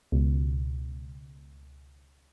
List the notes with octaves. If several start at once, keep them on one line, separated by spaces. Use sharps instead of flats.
C#2 B2